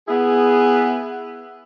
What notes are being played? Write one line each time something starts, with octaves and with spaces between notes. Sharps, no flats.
B3 E4 G#4